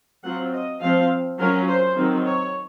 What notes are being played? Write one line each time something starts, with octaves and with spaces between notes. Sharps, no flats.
F#3 C4 F4 F#5
D#5
F3 C4 F4 F5
F#3 C#4 F4 A#4
C5
D#3 F#3 C4
C#5